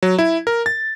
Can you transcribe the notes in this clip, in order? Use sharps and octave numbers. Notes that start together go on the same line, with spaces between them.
F#3
E4
A#4
A6